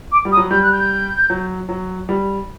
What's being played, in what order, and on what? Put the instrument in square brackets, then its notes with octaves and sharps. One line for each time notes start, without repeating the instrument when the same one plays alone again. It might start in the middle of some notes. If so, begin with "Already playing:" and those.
[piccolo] D6
[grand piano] G3
[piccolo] D#6
[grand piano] F#3
[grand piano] G3 [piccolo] G6
[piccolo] F#6
G6
[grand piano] F#3
F#3
G3